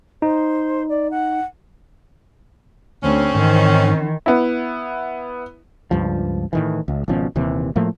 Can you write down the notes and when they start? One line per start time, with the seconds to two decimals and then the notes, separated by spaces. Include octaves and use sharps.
0.22 D#4 C5
0.88 D5
1.10 F#5
3.03 D2 C4 C#4
3.35 G#2 D#3 E3
4.26 B3 E4
5.91 C#2 G2 F3
6.53 A2 D#3 E3
6.88 C#2
7.08 G#1 B2 F3 C#4
7.35 D#1 D#2 C3 E3
7.76 A2 F3 A3 A#3